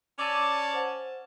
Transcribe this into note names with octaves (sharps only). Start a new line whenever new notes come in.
C#4 D5 A5 D6 E6 D#7
C5 F#5